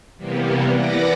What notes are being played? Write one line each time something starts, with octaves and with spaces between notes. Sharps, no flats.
C3 E3 G3 A#3 B3
E3 B4 D5 F#5 D6 A#6